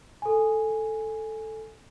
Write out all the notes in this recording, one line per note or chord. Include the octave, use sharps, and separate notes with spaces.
A4 G#5